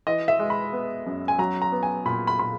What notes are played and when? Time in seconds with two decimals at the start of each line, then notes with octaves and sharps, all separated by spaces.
0.07 E3 D#5
0.28 E5
0.39 G#3
0.50 B5
0.73 B3
1.06 F#2
1.28 G#5
1.38 F#3 A#5
1.62 A#5
1.72 B3
1.83 G#5
2.05 A#2 B5
2.27 B5
2.39 A#2 B5